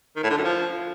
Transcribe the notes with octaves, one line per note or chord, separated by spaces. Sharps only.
D#3
A2
D3
F#2
F3